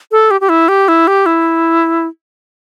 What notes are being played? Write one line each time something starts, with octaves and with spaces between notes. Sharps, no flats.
A4
G4
G4
E4
G4
E4
G4
E4